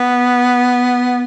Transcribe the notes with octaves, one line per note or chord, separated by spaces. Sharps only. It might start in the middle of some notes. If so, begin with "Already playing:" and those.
Already playing: B3